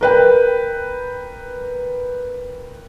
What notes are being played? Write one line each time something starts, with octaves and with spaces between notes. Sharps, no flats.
A#4 B4 G5